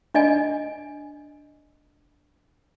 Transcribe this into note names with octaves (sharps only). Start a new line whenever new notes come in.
D4 D5 D#5 G#5